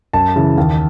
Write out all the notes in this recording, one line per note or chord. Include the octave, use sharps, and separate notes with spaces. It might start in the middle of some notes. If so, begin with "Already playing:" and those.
F#2 A5
C#3 E3
D#2